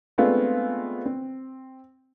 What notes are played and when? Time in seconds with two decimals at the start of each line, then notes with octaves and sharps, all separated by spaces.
0.18 G#3 A3 B3 C4 D4 F4
1.06 C4